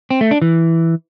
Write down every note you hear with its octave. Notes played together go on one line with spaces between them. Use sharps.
C4
A3
D4
E3